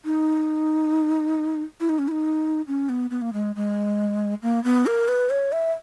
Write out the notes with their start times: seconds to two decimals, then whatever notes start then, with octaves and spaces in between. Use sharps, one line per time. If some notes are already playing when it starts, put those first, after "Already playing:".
0.05 D#4
1.80 E4
1.89 D#4
1.99 C#4
2.08 E4
2.11 D#4
2.67 C#4
2.89 B3
3.10 B3
3.22 A#3
3.33 G#3
3.56 G#3
4.43 A#3
4.64 B3
4.86 A#4
5.08 B4
5.30 C#5
5.52 E5